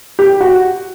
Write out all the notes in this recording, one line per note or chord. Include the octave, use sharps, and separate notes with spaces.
G4
F#4